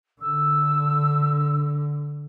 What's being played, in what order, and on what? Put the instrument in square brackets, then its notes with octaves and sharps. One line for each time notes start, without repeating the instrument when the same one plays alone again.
[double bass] D3 [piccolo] E6